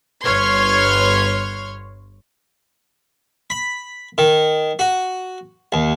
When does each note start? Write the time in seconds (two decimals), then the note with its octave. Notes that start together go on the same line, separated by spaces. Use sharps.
0.24 G1 B4 C#5 C6 F6 G#6
3.50 B5
4.18 D#3
4.79 F#4
5.72 D#2